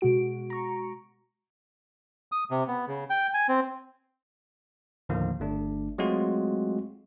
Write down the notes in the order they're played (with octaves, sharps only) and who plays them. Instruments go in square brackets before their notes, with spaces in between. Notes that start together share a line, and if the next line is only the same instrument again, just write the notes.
[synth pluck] B2 G#3 F#4 D7
A#5 C#6
[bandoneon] D#6
C3
B3
C#3
G5
G#5
C4
[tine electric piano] D#2 A2 D3 D#3 F3 A#3
G1 A3 D4
F#3 G#3 A3 C4 F4 F#4